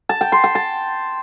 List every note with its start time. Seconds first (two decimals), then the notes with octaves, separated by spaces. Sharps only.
0.09 A5
0.21 G5
0.32 C6
0.44 G5
0.55 A5